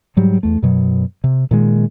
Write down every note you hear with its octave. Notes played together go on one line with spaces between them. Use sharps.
G#2 F#3 G3
E2 A3
F#2 B2 F#3
C3
A#2 D#3 G#3